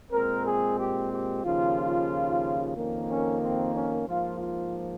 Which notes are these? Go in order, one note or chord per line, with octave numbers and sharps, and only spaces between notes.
A#2 G#3 C4 A#4
G#4
G4
G4
D#2 C#3 F3 F4
F2 D#3 A#3 C#4
C#4
C4
C#4
G#2 F3 A#3 F4
F4